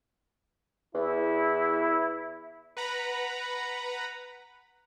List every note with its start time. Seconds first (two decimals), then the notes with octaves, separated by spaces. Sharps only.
0.95 E2 E4
2.77 B4 F#5 A#5 B5